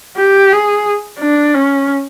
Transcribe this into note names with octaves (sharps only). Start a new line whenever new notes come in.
G4
G#4
D4
C#4